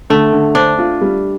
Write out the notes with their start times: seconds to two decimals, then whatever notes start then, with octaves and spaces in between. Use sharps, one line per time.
0.10 D3 A3
0.33 D3
0.55 D4 C5
0.79 F4
1.01 G3